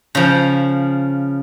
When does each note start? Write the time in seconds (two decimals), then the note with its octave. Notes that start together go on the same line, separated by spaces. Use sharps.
0.15 C#3 F3